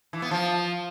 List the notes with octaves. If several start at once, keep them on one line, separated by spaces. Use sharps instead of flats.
E3
B3
F3